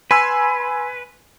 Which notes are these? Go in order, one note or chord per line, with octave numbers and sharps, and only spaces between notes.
B4 G#5 C6 E6